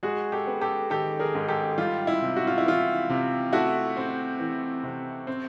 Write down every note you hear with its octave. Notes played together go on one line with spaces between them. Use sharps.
G#3 F#4 G#4
G4 A4
B3
G4 A4
D#3 G4 A4
G#4 A#4
G#2
G4 A4
G3 F4
E4
C3
F#4
F4
E4
E3 F4
C3
A3 E4 F#4
C4
E3
C3
C4